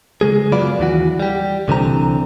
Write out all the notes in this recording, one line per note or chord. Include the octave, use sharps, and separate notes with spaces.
C#3 G#3 G#4
F#2 F#3 B3 F4 D5 B5
D#2 E3 F#4
G3 G4
C2 D3 E3 C4 A#5